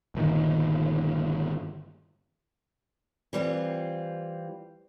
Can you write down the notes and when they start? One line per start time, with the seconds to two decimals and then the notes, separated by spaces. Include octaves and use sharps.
0.15 G1 A#2 D#3
3.33 E3 G3 C4 F4